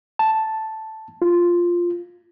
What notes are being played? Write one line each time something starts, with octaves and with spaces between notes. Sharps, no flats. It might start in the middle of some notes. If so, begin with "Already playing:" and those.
A5
F4